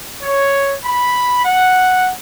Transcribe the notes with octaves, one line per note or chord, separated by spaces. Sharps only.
C#5
B5
F#5